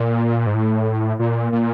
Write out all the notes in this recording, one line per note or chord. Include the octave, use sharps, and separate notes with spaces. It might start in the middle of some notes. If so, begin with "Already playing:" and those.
Already playing: A#2
G#2
A2
A#2
A#2